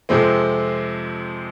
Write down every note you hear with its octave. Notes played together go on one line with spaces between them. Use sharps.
F2 C3 F3 G#3 C4